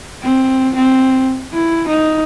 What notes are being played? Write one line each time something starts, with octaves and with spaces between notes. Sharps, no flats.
C4
C4
E4
D#4